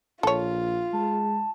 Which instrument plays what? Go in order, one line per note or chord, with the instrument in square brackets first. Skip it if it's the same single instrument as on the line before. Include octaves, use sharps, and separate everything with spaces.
[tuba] A#1 [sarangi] F4 [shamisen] A4 C#5
[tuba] G#3 [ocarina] A5